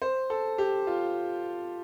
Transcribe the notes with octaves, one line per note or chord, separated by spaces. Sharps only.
C5
A4
G4
F4